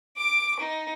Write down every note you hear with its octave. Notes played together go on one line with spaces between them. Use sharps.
D6 D7
D#4